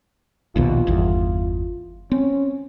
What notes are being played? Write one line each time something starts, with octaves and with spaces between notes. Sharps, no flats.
A#1 D#2 B2 F4
G1 E2
C4 C#4